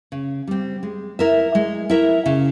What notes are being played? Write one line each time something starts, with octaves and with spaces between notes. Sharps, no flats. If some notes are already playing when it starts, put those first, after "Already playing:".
C#3
G3 C4
G#3
E4 A#4 E5
G#3
E4 A#4 E5
C#3